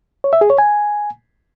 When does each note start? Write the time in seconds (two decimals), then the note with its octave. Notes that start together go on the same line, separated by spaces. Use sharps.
0.24 C#5
0.33 E5
0.41 G#4
0.50 C#5
0.58 G#5